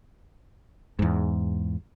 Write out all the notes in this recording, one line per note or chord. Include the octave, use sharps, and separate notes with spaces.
E2 G#2